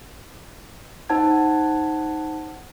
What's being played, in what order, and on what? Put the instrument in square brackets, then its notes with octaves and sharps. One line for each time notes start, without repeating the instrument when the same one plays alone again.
[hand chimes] D#4 C5 F#5 A5 G#6